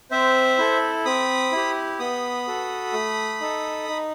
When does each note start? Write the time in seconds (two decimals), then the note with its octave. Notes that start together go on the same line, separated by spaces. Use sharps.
0.11 C4 C5 E5
0.58 E4 A4
1.05 C4 B5 D#6
1.52 E4 G4
1.99 B3 B5 D#6
2.47 F#4 A4
2.93 A3
3.40 D#4 A4
3.89 D#4